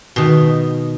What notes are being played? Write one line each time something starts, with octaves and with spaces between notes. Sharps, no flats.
B2 D#3